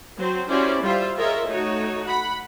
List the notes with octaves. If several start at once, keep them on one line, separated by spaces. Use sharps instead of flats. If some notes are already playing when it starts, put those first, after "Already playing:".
F#3 C4 C5
C#4 E4 F#4 G4 C5 D5
G3 F4 C5 E5 F5
F4 G#4 A#4 C#5 D#5 E5
A3 D#4 F#4 C#5
F#5 B5